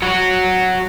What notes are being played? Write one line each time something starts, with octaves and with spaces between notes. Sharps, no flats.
F#3 F#4 C#5